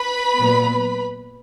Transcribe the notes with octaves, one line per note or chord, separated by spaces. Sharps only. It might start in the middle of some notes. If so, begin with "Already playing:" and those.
Already playing: B4 B5
A#2 F#3 B3